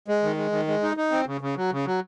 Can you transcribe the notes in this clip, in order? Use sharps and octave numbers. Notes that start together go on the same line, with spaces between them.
G#3
D#3
G#3
D#3
G#3
D#4
D#4
C4
C#3
C#3
F#3
C#3
F#3